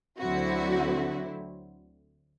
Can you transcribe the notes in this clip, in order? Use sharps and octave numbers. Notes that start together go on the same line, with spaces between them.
D2 D3 F#3 C4 E4 F#4